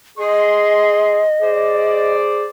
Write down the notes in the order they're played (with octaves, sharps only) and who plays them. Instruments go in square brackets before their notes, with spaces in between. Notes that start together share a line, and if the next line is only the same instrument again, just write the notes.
[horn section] G#4 C6 [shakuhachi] D#5
[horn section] G#4 C5 D5